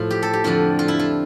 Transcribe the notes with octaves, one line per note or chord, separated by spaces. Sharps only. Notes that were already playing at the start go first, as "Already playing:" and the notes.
Already playing: A2 F3 F4
G4
A4
G4
F2 D3 F3 F4
F4
E4
F4